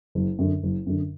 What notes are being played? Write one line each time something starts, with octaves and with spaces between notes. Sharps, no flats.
F#1
F#2 D3
F#1
F#2 D3